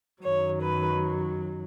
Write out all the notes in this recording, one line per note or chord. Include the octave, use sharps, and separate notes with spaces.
F#2 D#3 F#3 C#5
B4